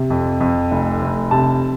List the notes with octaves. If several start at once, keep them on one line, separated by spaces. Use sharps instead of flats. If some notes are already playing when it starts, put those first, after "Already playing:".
Already playing: C3
F2
F2
F1
F1
C3 A5